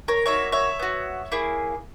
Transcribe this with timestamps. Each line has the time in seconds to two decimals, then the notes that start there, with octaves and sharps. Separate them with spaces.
0.08 A#4 C#5
0.26 A#3 D#4 F#4 C#5 E5
0.52 C#5 E5
0.79 B3 F#4
1.32 A#3 E4 G#4